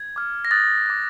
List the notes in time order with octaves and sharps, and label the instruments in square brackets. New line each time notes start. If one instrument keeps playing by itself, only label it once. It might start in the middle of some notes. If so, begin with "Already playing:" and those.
Already playing: [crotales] G#6
D6 F6
A#6
D#6 F#6 A6
D6 F#6